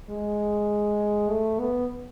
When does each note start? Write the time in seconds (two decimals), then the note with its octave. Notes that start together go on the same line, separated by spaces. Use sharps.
0.10 G#3
1.30 A3
1.60 B3